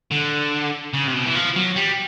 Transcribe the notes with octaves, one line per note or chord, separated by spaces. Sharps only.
D3
C#3
C3
B2
E3
F3
F#3
G3